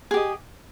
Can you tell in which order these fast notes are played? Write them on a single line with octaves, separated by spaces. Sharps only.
G#4 G4 D#5